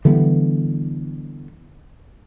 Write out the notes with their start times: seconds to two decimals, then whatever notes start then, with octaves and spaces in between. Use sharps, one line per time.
0.05 D3 E3 G3 B3